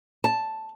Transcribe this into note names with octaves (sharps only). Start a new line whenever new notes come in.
A5